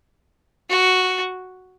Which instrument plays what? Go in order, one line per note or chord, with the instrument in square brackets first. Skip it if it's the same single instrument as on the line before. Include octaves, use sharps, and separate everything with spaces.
[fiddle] F#4